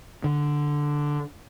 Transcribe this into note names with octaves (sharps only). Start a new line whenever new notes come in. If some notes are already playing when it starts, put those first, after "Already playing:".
D3